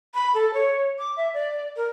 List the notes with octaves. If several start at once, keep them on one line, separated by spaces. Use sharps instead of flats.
B5
A4
C#5
D6
E5
D5
A#4